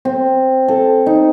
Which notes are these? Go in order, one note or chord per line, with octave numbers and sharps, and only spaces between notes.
C4
A4
D#4